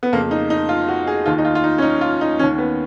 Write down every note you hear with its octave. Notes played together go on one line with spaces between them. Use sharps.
B3
F2 C#3 A#3
D#4
D#4
F4
F#4
G#4
D#2 D#3 F4
D#4
F4
F4
D#4
C#4
D#4
F4
D#4
D#2 D#3 C#4
B3